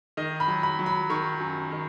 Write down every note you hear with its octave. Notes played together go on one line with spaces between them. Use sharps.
D#3 D#5
B5
F#3
B5
F#3
B5
D#3 C#6
F#2
D#3